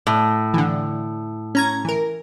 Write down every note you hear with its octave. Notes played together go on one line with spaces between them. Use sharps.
A2
D3 E3
C#4 A#5 G#6
E3 A#4